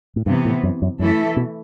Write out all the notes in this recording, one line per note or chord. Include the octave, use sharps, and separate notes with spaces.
A2
G2 C3 E3 B3
A2
F#2
F#2
F#2 E3 A3 E4 A4
B2